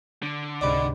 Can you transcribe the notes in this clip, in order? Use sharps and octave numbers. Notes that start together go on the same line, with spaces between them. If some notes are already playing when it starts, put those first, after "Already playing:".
D3 D7
C#2 G#2 C3 D5 D#5 B5